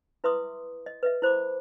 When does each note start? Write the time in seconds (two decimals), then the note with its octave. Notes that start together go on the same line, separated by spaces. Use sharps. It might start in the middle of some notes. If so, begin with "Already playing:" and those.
0.24 E4 B4 E5 C6 D6 D#6
0.86 D#5
1.03 B4 D#5 E5
1.22 E4 C5 B5 D6